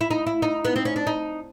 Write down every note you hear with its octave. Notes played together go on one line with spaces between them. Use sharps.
E4
D#4
E4
D#4
B3
C4
C#4
D4
D#4